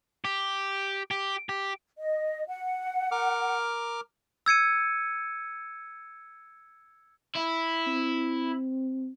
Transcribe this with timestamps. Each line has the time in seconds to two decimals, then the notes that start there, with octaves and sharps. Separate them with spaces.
0.25 G4
1.11 G4
1.49 G4
1.98 D#5
2.48 F#5
3.11 A#4 D6 F6
4.46 E6 G#6 C#7 D#7
7.36 E4
7.87 C4